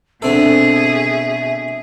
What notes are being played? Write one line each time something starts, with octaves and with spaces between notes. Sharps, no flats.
B2 D3 C4 G#4 A4 E5